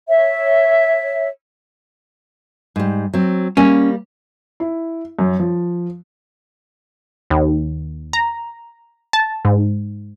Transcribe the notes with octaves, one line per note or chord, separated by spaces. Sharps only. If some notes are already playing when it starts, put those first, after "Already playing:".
C#5 E5
G#2 G3
F#3 C4
G3 A#3 C#4
E4
F#2
F3
D#2
A#5
A5
G#2